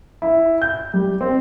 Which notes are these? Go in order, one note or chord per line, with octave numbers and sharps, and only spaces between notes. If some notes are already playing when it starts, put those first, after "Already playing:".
E4
G6
G3
C4